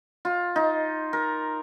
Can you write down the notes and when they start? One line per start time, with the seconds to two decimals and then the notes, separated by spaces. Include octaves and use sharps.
0.25 F4
0.56 D#4
1.13 A#4